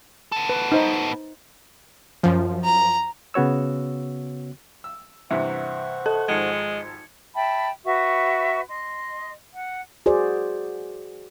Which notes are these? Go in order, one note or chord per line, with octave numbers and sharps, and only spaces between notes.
B3 A4
B4
D#4 C5 D#5
F#2 F3
A#5
C#3 B3 F#4 C#5 E6
E6
G2 C3 E3 C5 E5 F#5 C#6
A4 A5
G#1 F3 G#3 G#6 C#7
E5 G5 A5 B5
F#4 B4 E5 C#6
D#5 C6
F#5
F#4 G#4 C5 D5